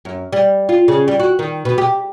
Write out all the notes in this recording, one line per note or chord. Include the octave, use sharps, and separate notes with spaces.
F#2
G3
F4
C#3
G3
F#4
D#3
B2
G4